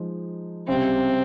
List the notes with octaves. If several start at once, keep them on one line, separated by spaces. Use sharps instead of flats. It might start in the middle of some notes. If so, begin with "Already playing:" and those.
Already playing: F3 G#3 D#4
C#2 C3 G3 C4